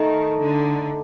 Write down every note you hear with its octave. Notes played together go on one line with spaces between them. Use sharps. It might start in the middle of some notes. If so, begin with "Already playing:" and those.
Already playing: D#3 A3 D#4 A4 D#5
D3